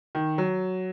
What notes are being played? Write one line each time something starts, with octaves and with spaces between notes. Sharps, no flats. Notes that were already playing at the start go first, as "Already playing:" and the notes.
D#3
F#3